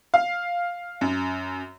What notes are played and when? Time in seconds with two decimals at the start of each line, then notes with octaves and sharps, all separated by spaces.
0.14 F5
1.01 F#2